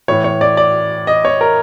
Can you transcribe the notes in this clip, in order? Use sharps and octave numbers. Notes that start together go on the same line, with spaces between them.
A2 E3 C#5
C#5
D5
D5
D#5
C#5
A#4